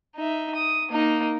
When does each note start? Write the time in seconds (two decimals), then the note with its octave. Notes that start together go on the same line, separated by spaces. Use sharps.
0.16 D#4 E5
0.55 D#6
0.91 A#3 D#4